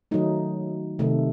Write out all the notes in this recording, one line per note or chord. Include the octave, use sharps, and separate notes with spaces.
D#3 F#3 A3 D#4
C3 D#3 A3